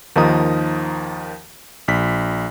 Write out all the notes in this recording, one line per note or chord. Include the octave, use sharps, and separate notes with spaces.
D#2 D#3 F3 D#4 A#5 D#6
A#1 B6